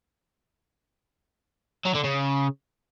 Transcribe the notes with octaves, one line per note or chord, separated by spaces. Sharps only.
F#3
D3
C#3